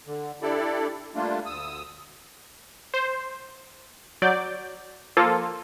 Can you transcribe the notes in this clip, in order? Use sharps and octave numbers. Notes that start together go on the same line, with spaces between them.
D3
D4 E4 G4 A4 D5
G3 A3 A#3 D4 F4
D2 D#6 E6
C5
F#3 D5 G6
F3 A#3 F4 A4